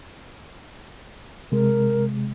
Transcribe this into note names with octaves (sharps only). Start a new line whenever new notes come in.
C3 G#3 A#4